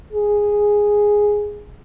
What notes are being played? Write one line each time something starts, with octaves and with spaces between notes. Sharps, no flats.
G#4